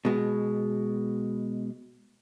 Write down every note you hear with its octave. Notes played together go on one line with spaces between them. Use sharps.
B2 G#3